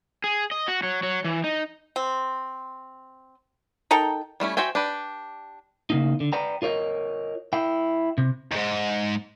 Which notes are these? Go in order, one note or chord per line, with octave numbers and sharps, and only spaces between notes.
G#4
D#5
F#4
F#3
F#3
E3
D#4
C4
D#4 A4 A#4 G5
G3 A3 C#4 E4
F#4 C5 E5 G5 G#5
D4 G4 B4
C#3 A#3 D#4
D3
B4 D5 G5 A#5
F4 A#4 C#5 D#5
E4 G5
C3
D#2 G#2